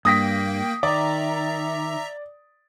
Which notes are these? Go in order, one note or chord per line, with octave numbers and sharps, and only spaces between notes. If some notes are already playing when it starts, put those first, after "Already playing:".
G2 A#3 G5 D#6 A#6 B6
D#3 D5 E5 A#5